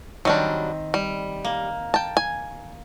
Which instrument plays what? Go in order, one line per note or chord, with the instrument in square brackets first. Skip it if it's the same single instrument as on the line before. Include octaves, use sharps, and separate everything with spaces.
[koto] D#3 C4 [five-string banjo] F#3 G3 D4
[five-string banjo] G3
[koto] A#3
[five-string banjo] G5 A5
G#5